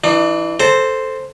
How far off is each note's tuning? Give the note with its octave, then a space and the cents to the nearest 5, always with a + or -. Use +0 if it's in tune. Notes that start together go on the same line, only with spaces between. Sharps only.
E3 +0 D4 +45
A4 +0 C5 +0 A#5 -30